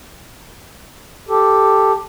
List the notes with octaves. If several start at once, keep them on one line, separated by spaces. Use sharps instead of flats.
G4 A4